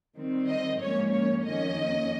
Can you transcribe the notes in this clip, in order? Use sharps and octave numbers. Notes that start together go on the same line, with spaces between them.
D#3 G3 C4
D#5
G#2 F3 A#3 C#4 C#5
C#5
F2 D#3 A#3 C#4 D#5